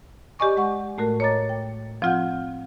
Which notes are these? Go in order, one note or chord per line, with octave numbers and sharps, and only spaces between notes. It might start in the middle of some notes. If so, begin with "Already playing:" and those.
G4 D5 D#5 G#5 C#6 D6
G#3 F#5 C#6
A2 A3 F#4 A#4
C#5 D#5 A#5 D6 A6
G5
F3 C4 F4 F#5 G6